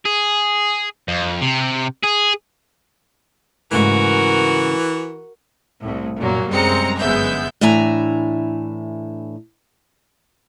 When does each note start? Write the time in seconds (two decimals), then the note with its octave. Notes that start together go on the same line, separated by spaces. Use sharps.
0.05 G#4
1.08 F2
1.42 C3
2.04 G#4
3.71 G#2 C#3 E3 A3 F#4 A#4
5.81 C2 A2
6.17 F#2 A#2 F#3 A#3
6.49 F#2 G3 G#3 C4 A#5 C#7
7.00 G1 F#2 G#3 B3 E5 G6
7.61 A2 E3 D4 E5 G#5 A#5